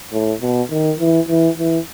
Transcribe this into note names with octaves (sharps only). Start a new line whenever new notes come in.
A2
B2
D#3
E3
E3
E3